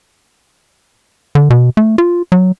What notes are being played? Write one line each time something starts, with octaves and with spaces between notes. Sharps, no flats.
D3
B2
A3
F4
F#3